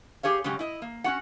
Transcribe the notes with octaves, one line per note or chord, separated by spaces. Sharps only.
G4 G#4 C#5 F5
C#3 F#3 G#3 C#4 G4
E4 D#5
A#3
C#4 F#4 F#5